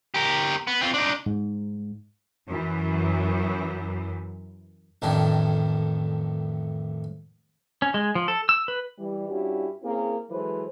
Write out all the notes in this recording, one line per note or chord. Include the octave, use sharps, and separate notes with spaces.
G4 A#4
B3
C4 F4
D4 D#4
G#2
F#2 E3
A1 F2 A2 D#3 D4
C#4
G#3
F3
A4
E6
B4
E3 G3
G2 C#4 E4 F#4 G4
A#3 C4 C#4 E4 G#4 A#4
E3 F#3 G#3 A4 B4 C5